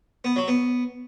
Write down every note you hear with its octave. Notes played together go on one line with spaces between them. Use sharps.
B3
F#3
B3